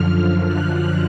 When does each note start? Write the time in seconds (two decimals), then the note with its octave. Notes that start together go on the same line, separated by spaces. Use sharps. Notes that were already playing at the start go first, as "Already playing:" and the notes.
Already playing: F#2 D3 F3 F6
0.45 F#6